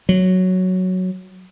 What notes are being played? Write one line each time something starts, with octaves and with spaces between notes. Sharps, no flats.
F#3